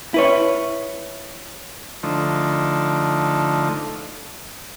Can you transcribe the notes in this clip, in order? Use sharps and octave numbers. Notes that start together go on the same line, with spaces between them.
E4 B4 C#5
D3 F3 A3 D#4